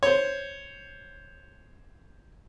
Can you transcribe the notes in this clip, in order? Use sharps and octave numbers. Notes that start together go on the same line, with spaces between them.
C5 C#5